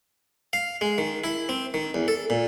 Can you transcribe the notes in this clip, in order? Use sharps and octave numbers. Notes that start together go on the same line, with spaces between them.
F5
G#3
D#3
E4
C4
D#3
E2
A4
A#2